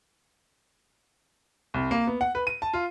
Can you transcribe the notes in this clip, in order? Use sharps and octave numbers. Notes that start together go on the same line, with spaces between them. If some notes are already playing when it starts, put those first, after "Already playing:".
C2
A#3
B3
F#5
B4
D#7
A5
F4